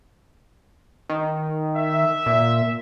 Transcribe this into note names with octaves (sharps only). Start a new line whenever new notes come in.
D#3
E5
A#2